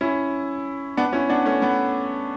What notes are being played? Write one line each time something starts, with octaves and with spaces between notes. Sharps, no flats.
C#4 E4
B3 D4
C#4 E4
B3 D4
A3 C#4
B3